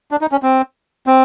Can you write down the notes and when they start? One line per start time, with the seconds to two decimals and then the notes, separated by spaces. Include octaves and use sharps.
0.11 D4
0.21 D#4
0.32 C#4
0.43 C4
1.07 C4